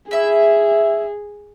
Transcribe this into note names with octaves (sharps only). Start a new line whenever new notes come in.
E4 G#4 E5